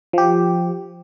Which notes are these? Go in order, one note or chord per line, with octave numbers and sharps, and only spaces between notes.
F3 G4